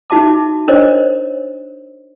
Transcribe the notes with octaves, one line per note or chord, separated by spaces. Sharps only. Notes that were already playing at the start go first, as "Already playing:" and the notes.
D#4 F#4 E5 A5 D6
D4 A#4 C5 C#5 D#5